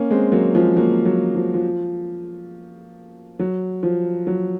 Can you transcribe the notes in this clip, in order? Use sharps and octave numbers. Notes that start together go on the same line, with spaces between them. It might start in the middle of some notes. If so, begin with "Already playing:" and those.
Already playing: A#3 C#4
G#3 C4
F#3 A#3
F3 G#3
F#3 A#3
F#3
F3
F3
F#3
F3
F#3